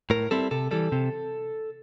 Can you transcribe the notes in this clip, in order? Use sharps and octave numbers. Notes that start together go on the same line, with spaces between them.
A2 A#4
G3 C4 E4 A4
C3 A4
E3 G3 A4
C3